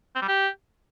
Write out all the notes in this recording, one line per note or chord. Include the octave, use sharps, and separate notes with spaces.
C4
G3
G4